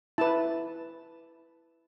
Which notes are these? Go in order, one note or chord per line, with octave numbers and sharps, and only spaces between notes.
E4 B4 A5